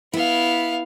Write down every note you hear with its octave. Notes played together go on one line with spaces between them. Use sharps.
B3 E4 F5